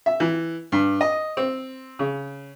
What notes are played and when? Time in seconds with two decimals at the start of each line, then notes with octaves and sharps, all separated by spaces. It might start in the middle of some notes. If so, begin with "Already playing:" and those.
0.06 E5
0.20 E3
0.72 G2
1.01 D#5
1.37 C4
1.99 C#3